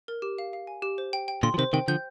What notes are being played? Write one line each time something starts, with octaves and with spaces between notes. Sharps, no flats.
A#4
G4
F5
F5
G#5
G4
C5
G5
G5
A#2 D3 C6
F3
C3 D#3 C5
C3 D#3 G5
D3 F3 G6